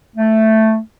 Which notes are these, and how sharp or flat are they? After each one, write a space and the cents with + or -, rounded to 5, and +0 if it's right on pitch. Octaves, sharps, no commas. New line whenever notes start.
A3 +0